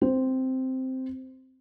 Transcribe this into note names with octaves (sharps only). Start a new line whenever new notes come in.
C4 C5